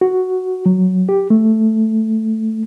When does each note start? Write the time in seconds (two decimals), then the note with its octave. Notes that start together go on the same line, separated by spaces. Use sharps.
0.01 F#4
0.66 F#3
1.09 G4
1.30 A3